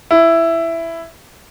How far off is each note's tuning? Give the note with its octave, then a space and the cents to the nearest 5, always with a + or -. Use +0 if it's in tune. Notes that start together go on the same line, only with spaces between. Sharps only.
E4 +10